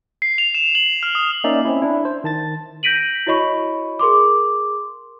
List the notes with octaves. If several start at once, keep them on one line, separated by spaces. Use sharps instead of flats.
C7
F7
E7
F#7
F6
D#6
A#3 C#4 D#4 D5 E5
C4 C#4 E4
D4 E4
C5
D#3 A5 A6
G6 A#6 B6 D7 D#7 F#7
E4 F#4 C#5 D#5 B5 C#6
G#4 A#4 C6 D6